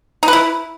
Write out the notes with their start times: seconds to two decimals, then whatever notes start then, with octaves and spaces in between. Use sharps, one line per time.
0.23 D#4
0.28 B4
0.33 E4